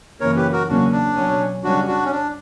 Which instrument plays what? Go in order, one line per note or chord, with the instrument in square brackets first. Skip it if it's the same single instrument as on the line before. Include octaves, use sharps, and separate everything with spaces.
[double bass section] F#2 C#3 E3 A#3 C#4 [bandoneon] A#4 C#5
[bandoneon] G4 B4
F#4 A#4
[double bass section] E2 C#3 F#3 A#3 C#4 [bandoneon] D4 F#4
[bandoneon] D4
[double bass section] B2 F#3 C#4
[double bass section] F#2 C#3 G3 C#4 [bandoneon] D4 F#4
[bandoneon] D4 F#4
C#4
D4